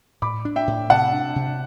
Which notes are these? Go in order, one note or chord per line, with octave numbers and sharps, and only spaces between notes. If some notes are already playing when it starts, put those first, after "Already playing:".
A2 B5 D6
D4
E5 G5
A2
C3 F#5 A5
D4
C3